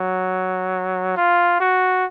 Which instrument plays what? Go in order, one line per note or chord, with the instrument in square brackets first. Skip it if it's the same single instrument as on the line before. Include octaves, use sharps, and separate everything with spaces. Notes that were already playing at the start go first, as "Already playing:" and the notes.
Already playing: [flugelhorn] F#3
F4
F#4